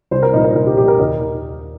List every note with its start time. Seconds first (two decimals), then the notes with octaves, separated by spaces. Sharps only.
0.11 C2 C5
0.23 A#4
0.34 A#2 F3 D#4
0.40 C5
0.44 A#4
0.55 C2 A#4
0.67 G4
0.77 A#2 F3 G4
0.88 A#4
0.99 D#2 D#5